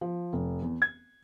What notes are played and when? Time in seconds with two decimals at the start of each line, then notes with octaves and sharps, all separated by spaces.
0.01 F3
0.33 F1
0.62 E2
0.82 G#6